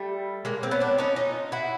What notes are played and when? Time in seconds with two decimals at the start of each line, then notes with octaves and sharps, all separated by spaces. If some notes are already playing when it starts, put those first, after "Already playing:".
Already playing: G3 A3
0.45 G#3 A#3
0.63 A#3 C4
0.71 B3 C#4
0.80 C4 D4
0.98 C#4 D#4
1.16 D#4 F4
1.52 E4 F#4